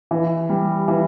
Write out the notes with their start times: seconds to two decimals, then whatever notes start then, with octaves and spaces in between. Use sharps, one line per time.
0.11 E3
0.49 G3
0.88 E3